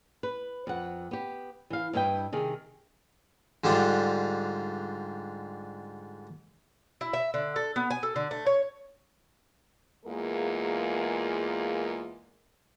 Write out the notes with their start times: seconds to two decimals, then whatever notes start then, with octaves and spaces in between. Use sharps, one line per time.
0.23 B4
0.67 F2 F#5
1.11 B3 G4
1.70 E3 F5
1.93 G2 E4 B4 D#5 G5
2.32 C3 D#3 G#4
3.64 G#2 D3 G3 D4 F4
7.01 E4
7.13 E5
7.34 D3
7.56 A4
7.76 B3
7.90 G#5
8.03 A4
8.16 D3
8.31 A3
8.46 C#5
10.05 E2 G#3 A#3 F4 G#4 A#4